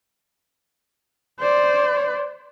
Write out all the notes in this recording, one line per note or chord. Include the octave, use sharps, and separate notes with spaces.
C5 D5